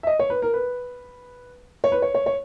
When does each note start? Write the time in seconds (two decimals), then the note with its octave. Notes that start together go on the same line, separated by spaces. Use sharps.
0.03 E5
0.07 D#5
0.19 C#5
0.30 B4
0.42 A#4
0.54 B4
1.84 C#5
1.92 B4
2.02 C#5
2.15 C#5
2.26 C#5